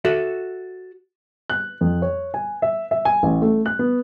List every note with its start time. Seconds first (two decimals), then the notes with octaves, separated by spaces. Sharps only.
0.05 F#4 A4 E5
1.50 F#6
1.81 F2
2.02 C#5
2.34 G#5
2.62 E5
2.91 E5
3.05 G#5
3.23 A1
3.42 A3
3.66 F#6
3.79 B3